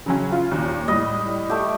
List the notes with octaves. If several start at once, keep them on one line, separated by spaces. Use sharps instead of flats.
C#3 F#3 C#4
F4
D#2 A#2
A2 G3 D#5
A3 G4